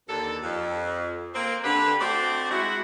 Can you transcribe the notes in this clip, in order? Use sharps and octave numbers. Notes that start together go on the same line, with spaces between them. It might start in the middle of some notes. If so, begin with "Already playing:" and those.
D#2 D3 A4
F2
A#3 C4
D3 G4 B4
A3 C4 F#4 C5 D5 D#5
G#3 E4 F#4